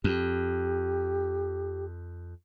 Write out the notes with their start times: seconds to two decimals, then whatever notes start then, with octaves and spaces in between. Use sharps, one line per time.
0.04 F2 G4